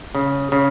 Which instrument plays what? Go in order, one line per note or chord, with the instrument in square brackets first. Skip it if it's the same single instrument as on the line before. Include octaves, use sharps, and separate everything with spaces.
[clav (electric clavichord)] C#3
C#3